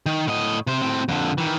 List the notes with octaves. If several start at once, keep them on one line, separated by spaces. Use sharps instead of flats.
D#3
A2 D#5
C3 C5
A2 C4
F2 D3
D#3 E3